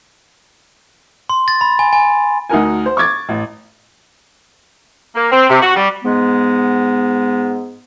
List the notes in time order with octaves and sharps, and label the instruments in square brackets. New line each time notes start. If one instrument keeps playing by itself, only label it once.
[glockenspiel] C6
A6
B5
G#5
G#5
[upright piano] D2 D#4 F#4 A#4 G#5
C5
C#6 D6 G#6 A6
A1
[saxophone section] A#3
C4
C3
F#4
G3
[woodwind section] G#2 G#3 B3